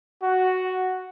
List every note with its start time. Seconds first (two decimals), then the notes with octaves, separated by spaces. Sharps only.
0.22 F#4